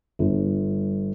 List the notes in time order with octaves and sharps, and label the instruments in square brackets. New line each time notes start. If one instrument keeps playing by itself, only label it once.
[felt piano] G1